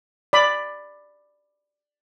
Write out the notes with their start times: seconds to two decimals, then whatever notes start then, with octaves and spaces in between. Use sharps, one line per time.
0.33 D5 B5